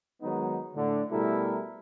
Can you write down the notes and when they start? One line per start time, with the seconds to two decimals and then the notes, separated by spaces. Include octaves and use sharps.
0.22 D#3 F#3 G#3 B3 D#4
0.74 A2 D3
1.11 B2 G3 A3 E4 A4 A#4